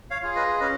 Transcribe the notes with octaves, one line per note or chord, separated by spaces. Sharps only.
C#5 F5
F4 G#4
B4 D#5
C#4 B4 D#5